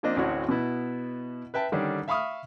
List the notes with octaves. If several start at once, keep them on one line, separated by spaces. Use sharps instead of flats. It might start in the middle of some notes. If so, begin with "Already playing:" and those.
F3 A#3 C4 D4 D#5
A1 D2 E3 C4 F#4 C#5
B2 B3 E4
B4 E5 G5 A5
D3 D#3 G3 C#4 D4
E5 F5 B5 C#6 D#6 F6